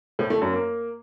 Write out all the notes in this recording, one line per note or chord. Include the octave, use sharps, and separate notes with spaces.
A2
A3
F#2
A#3